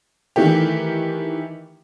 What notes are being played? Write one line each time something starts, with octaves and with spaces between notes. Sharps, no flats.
D#3 E3 A3 G4